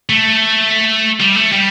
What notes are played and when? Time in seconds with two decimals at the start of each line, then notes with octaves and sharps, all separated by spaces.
0.10 A3
1.20 G3
1.37 A3
1.52 G3